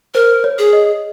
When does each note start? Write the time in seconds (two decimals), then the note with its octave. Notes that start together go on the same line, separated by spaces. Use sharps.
0.14 A#4 C5
0.44 C#5
0.58 G#4
0.73 D#5